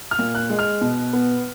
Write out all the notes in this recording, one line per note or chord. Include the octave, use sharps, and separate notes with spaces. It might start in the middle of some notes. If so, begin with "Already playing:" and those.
F6
A#2
F#6
G#3
F6
B2
B3